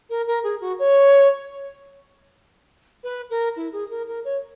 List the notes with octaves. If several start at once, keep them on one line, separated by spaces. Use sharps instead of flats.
A#4
A#4
G#4
F#4
C#5
B4
A#4
E4
G#4
A#4
A#4
C#5